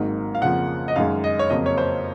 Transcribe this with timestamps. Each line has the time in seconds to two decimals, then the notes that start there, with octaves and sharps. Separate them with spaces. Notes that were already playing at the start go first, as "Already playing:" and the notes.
Already playing: G#1 G#2 D#3 F#3 A#3
0.35 F5
0.41 F2 C#3 F3 A#3 F#5
0.88 D#5
0.96 F#2 D#3 G#3 F5
1.24 D#5
1.39 C#5
1.50 F2 C#3 F#3 A#3 D#5
1.66 C#5
1.78 C5